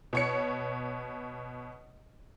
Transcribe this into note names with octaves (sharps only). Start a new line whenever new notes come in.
B2 C#5 C#7